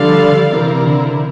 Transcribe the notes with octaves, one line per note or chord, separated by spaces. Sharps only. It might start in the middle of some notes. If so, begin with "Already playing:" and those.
Already playing: D3 F3 G3 D4 A4 D5 F5
C3 E3 C4 E4 A#4
D3